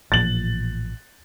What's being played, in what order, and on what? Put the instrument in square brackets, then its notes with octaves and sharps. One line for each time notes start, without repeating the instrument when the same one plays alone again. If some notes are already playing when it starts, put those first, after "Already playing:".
[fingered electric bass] A1 A#2 F3 [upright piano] A6 F#7